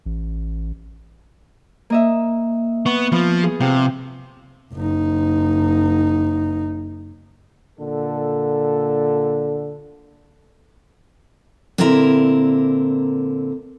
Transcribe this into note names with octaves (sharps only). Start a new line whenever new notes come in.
A1
A#3 D#5 E5
B3 C#6
F3 B3 F6
G#4
C3 F3 F5 G5
F#1 D#4
A#2 D3 A4
A#2 D3 C4 E4 A#4 A#5